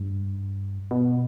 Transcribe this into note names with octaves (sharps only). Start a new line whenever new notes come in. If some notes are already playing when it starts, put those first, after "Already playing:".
Already playing: G2
B2